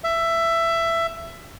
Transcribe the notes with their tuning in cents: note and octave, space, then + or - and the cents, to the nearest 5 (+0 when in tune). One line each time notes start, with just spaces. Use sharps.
E5 +15